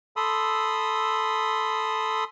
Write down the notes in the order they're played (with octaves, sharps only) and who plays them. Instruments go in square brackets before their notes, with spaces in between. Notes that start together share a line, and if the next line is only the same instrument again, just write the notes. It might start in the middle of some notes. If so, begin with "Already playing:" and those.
[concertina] A4 B5 C6 D#6 E6